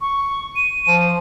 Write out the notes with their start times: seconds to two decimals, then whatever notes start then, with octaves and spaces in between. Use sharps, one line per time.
0.01 C#6
0.56 D#7
0.87 F3